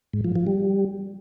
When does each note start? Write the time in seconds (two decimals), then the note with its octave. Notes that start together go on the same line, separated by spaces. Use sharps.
0.13 G#2
0.25 F3
0.36 F3
0.47 G3